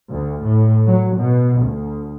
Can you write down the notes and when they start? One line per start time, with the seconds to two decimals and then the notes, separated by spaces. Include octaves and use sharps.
0.11 D2
0.45 A2
0.87 F#3
1.18 B2
1.64 D2